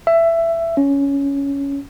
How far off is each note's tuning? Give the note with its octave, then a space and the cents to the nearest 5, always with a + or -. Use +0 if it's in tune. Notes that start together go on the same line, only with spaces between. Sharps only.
E5 +15
C#4 +10